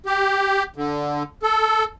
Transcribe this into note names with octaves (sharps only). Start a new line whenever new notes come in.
G4
D3
A4